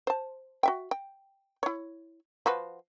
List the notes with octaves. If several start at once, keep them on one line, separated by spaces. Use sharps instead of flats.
C5 A5
F#4 E5 G5
G5
E4 C#5
F3 F#4 B4